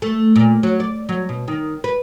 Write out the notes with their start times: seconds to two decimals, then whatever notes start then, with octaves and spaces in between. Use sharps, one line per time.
0.02 A3
0.36 A#2
0.63 F#3
0.80 D5
1.09 F#3
1.29 B2
1.48 D#3
1.84 B4